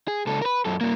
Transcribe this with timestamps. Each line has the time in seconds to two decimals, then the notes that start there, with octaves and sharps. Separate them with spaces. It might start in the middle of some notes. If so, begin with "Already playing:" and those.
0.08 G#4
0.27 C#2 A4
0.42 A#4 B4
0.65 F#2 A4
0.81 G2 A#3